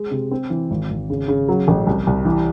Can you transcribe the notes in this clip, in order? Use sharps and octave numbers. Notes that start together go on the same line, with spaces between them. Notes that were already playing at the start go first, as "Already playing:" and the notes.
Already playing: G#3
C3
C4
E3
G#1
G#1
C#3
C#3
F#3
A1
C2
C2
E3